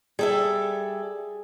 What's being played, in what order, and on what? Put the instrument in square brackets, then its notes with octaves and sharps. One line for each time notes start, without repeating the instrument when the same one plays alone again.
[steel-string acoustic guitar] G3 A4 E5 [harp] G#4